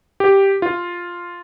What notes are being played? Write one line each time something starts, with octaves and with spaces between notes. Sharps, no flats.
G4
F4